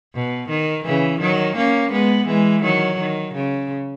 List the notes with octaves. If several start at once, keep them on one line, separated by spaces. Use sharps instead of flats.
B2
D#3
C#3 E3
D#3 F#3
A#3 C#4
G#3 B3
E3 G#3
D#3 F#3
D#3
C#3